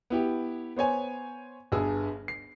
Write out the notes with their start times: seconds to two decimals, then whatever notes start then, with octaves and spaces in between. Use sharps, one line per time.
0.10 B3 E4 G4
0.76 B3 C5 C#5 G#5
1.72 G1 G2 G#4 E6
2.28 C7